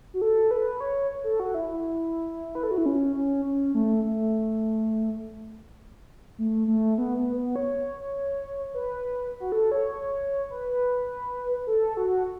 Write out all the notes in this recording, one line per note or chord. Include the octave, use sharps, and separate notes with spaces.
F#4
A4
B4
C#5
A4
F#4
E4
E4
B4
A4
F#4
E4
C#4
C#4
C#4
A3
A3
A3
A3
B3
B3
B3
C#5
B4
F#4
A4
C#5
B4
A4
F#4